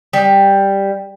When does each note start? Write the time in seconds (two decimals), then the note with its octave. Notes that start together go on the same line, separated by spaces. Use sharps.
0.13 G3